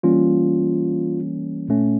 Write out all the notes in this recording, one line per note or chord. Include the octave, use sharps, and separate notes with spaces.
E3 G3 A#3 C#4 F4
A#2 A3 C#4